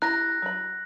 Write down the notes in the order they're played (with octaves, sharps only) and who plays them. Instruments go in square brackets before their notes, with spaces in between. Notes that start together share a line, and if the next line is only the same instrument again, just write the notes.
[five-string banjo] E4 G4 A#5 [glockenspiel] F#6 A#6
[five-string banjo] F#3 B5